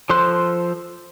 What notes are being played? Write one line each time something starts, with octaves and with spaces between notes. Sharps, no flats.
F3 A4 C5 C6 F#6